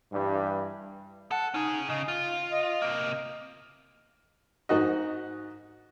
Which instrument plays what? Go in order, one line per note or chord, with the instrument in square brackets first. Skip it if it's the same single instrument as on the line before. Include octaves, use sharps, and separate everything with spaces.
[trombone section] G2 E3 G3
[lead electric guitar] A4 [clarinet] F#5
[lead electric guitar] C#4 G#4 [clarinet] D#4
[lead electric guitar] C#3 [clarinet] D#5
[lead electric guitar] F4
[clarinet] D#5
[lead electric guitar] C3 A#3
[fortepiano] G#2 D#4 F#4 D#5